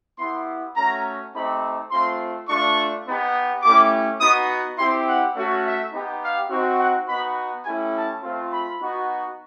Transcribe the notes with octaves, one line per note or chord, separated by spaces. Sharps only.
B3 E4 G4 C6
A3 C#4 F#4 A#5
A3 C4 D#4 G4 B5
A3 C4 F4 C6
A3 D4 F4 C#6
B3 D#4 G4
A3 C#4 E4 G4 D6
B3 D#4 F#4 D#6
C4 E4 G4 C6
F#5
A3 C#4 F#4
E5
B3 D#4 G4
F5
C4 D#4 F#4
F#5
B3 D#4 F#4 B5
A3 C#4 E4 G4 G#5
A5
A3 C4 F4
B5
B3 D#4 F#4